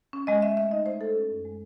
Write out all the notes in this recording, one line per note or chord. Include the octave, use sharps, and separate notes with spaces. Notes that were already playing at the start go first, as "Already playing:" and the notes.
C#4
G#3 D#5
C#4 E5
A3 E5
D#4 D#5
A3 C5
E4 A4
C#4
F#2
G#3